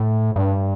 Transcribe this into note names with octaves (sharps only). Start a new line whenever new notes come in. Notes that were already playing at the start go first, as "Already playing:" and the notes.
Already playing: A2
G2